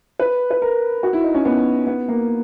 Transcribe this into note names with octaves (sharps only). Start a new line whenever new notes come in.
B4
B4
A#4
F#4
E4
D#4
C#4
B3
B3
A#3